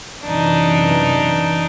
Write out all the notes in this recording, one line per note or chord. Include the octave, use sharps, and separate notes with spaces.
F#2 C3 E3 D4 D#4